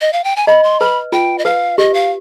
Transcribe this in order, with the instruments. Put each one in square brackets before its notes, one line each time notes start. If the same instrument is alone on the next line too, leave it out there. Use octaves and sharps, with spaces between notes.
[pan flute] D#5
F5
G5
G#5
[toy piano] D#5 [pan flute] B5
[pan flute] C6
[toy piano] B4 [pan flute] B5
[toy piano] F4 [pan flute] G5
[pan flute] D#5
[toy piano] B4 [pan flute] F5
[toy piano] G4 [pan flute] D#5
[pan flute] F5